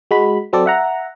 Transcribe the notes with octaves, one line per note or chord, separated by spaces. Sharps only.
G#3 F#4 B5
F#3 C4 A4 D5
E5 F#5 A#5